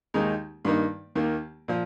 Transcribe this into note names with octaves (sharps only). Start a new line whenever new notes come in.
D#2 D#3 G#3 D#4
G2 D#3 A#3 D#4
D#2 D#3 A#3
A#2 F3